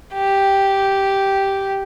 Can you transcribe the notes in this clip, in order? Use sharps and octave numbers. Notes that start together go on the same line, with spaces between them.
G4